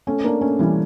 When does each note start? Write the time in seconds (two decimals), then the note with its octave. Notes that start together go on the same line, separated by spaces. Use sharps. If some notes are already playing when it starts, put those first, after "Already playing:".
0.07 A3 C#4
0.24 A#3 D4
0.41 A3 C#4
0.59 E3 G3